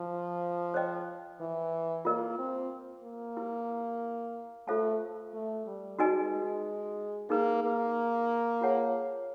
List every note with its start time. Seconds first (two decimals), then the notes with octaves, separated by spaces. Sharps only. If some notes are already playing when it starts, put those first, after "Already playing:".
Already playing: F3
0.74 C5 D#5 G5
1.40 E3
2.05 A#3 F4 A#4 D#5
2.38 C4
3.04 A#3
3.37 E4 G4 B4
4.68 A3 F4 A4 C5 F5 A5
5.34 A3
5.67 G3
5.99 G#3 D#4 F#4 B4 D#5 G#5
6.32 G#3
7.30 A#3 D#4 G#4 B4
7.63 A#3
8.61 F4 G#4 C#5 F#5 A5